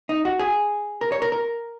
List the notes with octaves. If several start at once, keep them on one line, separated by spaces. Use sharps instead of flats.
D#4
F#4
G#4
A#4
C#5
A#4
A#4